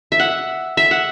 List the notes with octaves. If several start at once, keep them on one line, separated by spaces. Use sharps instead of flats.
E5
F#5
E5
F#5